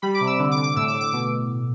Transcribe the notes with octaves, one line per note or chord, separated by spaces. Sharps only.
G3 B5
D6
C3
E6
D3
D6
D3
D6
A2 E6
D6
A2
D6
B2 D6